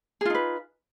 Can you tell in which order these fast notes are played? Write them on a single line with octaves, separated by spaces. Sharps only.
G#4 F4 D#4 B4